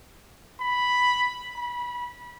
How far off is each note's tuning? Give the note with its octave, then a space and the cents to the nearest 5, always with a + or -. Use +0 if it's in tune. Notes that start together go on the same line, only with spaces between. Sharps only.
B5 +0
B5 -25